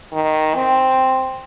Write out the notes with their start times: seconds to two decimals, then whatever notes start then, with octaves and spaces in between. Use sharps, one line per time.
0.13 D#3
0.55 C4